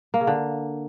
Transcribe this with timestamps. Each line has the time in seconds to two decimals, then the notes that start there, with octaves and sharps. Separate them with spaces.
0.14 A#3
0.21 C#3
0.27 D3